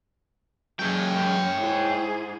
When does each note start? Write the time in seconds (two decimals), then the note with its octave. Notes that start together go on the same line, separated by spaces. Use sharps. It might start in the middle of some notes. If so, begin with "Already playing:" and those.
0.79 F#3 G#3 C#4 C#5 G5
1.58 G#2 E4 G#4